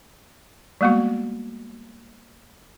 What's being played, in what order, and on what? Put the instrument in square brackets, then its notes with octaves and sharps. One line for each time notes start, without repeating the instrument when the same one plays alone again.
[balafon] G3 G#3 A#3 B3 F#4